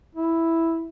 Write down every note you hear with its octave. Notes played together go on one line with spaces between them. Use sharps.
E4